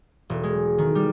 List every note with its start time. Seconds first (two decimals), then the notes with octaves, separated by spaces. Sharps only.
0.30 E1
0.44 G#3
0.78 D#3
0.95 G3